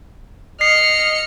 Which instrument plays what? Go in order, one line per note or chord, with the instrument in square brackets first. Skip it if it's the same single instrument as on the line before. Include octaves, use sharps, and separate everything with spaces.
[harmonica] D#5 [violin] F6 C#7 [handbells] C7